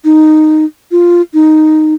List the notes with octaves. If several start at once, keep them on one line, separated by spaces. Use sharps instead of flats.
D#4
F4
D#4